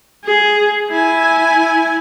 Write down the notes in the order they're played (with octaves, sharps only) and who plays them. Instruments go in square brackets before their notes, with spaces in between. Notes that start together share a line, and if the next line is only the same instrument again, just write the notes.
[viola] G#4
E4 G#5